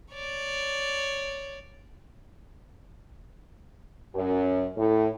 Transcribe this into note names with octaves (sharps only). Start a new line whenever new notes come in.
C#5 D5
F#2
A2